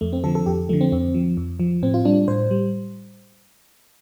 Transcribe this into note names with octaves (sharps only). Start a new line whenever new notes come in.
F2 A3
C4
D3 F3 A4
A4
F2 G4
D3 F3 A3
C4
F2 C4
F3
F2
F3
A2 C4
F4
G3 D4
A2 C5
G3